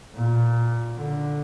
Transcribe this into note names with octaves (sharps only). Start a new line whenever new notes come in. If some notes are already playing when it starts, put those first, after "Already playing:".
A#2
D3